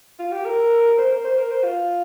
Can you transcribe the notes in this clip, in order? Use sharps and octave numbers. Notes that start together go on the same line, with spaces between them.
F4
G4
A#4
C5
A#4
C5
A#4
C5
F4